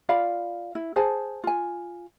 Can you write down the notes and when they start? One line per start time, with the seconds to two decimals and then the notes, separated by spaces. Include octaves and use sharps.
0.09 F4 D5 F5 B5
0.75 E4
0.96 G#4 C5 G#5 A5
1.44 F4 G#5